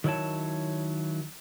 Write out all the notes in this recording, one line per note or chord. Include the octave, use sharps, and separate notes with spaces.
D#3 F#3 E4 C#5 A5